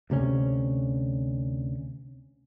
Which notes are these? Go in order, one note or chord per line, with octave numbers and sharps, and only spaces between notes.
D2 C3 G3 C#4